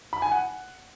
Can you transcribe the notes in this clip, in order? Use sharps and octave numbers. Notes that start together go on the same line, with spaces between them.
B5
G#5
F#5